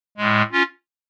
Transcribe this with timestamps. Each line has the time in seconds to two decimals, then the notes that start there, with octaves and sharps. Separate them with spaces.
0.17 A2 G#3
0.52 C#4 F4